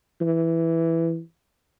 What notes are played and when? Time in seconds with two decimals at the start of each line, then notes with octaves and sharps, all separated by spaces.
0.21 E3